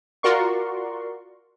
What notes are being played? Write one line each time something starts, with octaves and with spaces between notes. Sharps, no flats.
F4 F#4 A#4 D5 C6 C#6